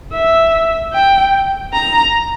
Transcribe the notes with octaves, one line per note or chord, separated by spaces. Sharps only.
E5
G5
A#5